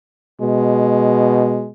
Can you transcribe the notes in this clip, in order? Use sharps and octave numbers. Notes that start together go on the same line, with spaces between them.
B2 G#3